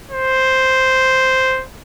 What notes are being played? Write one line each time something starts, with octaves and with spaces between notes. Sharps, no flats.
C5